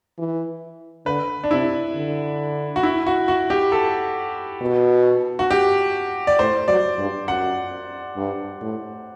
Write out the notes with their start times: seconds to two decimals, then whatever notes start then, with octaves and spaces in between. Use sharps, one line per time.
0.18 E3
1.06 D3 B4
1.44 D4
1.51 C3 E4
1.96 D3
2.76 F#4
2.83 E4
3.07 F#4
3.28 F#4
3.50 G4
3.72 A4
4.61 B2
5.39 F#4
5.51 G4
6.27 D5
6.39 A2 C5
6.68 F#3 D5
6.98 G2
7.27 F#2 F#5
8.17 G2
8.61 A2